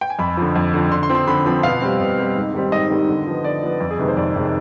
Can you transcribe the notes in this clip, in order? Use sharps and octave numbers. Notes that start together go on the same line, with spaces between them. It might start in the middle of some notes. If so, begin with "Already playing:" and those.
G5
G#5
F2 B5
D3 F3
F2
D3 F3
D3 C6
C6
F3 C4
C6
D3 B5
F3 C4 B5
B2 F5
G3 C4
B2
G3 C4
G#2
D#3 G3 C4
G#2 D#5
D#3 G3 C4
D3
F3 B3
D3 D5
F3 B3
F2
G#4
C3 D#3 G#3 B4
C5
F2 D5
C3 D#3 G#3